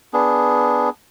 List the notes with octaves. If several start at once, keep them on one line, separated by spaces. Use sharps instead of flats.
B3 D4 G#4